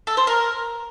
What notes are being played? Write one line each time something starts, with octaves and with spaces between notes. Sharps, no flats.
A4
C5
A#4